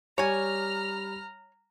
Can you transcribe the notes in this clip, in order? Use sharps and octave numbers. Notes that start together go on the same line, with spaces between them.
G3 C#5 G#5 A#5 F6